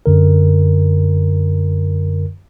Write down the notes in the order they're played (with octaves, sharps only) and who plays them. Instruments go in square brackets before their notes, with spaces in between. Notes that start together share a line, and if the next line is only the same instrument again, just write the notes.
[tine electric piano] F#2 D3 A#4